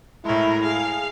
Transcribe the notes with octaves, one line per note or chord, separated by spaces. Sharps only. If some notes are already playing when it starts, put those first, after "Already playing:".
A2 G#3 E4 A#4
G#4 F5